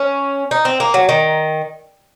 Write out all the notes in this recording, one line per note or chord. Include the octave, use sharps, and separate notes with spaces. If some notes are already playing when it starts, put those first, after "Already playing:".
Already playing: C#4
D#4
C4
A#3
F#3
D#3